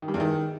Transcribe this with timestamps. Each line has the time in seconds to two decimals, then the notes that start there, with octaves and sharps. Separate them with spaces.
0.02 D#3
0.08 G2
0.14 E2
0.20 D#3